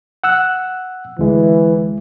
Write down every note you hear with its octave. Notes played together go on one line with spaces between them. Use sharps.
F#5 E6 F#6
D2 E3 G#3